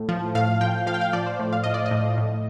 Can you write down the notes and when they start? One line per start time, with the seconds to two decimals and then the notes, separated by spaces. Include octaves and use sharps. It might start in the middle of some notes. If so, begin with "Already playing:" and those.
Already playing: A2
0.09 F3
0.35 A2 F5
0.61 F3 G5
0.87 F3 F5
0.94 G5
1.01 F5
1.13 F3 D5
1.26 C5
1.39 A2
1.53 F5
1.64 A2 D#5
1.74 D5
1.86 D#5
1.91 A2
2.18 A2